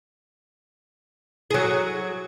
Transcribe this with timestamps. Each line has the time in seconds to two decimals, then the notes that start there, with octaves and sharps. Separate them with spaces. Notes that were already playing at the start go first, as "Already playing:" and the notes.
1.50 F#3 G#4